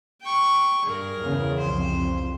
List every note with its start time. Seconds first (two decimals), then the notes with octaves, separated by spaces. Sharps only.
0.22 G5 C#6
0.85 G2 G#4 A#4
1.21 E2 C#3
1.60 C2 F2 C5